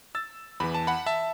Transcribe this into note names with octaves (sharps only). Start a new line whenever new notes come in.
E6 A6
E2 E3 B5
A5
F#5 B5
E5 A5